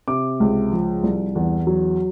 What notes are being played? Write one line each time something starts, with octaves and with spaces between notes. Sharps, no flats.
C3 D6
C#2
F3
C2
E2
F#3